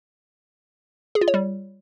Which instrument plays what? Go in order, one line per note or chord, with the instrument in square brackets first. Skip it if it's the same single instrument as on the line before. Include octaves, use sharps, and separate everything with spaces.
[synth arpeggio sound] G#4
F4
C#5
G3